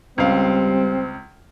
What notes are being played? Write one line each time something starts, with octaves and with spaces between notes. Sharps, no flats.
C#2 G3 C4 F5